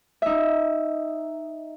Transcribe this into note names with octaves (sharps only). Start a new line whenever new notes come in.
D#4 E5